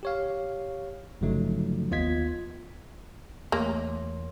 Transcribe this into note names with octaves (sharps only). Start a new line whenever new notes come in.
G4 C#5 F5
G1 C#3 F3 F#3 A3 D#4
D#2 B3 F4 D#5 G#6 B6
E2 A3 A#3 C#5 C6